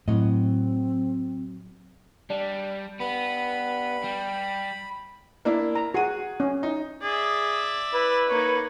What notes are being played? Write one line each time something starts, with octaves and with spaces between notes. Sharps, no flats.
A2 F#3 C4 D#5
G3 D4
G2 B3 B5
G3
A#3 D4 E4
A#5
F#4 G#4 D#7
C#4
D#4
G#4 D5 E5
E4 B4
A#3 D#4 C#5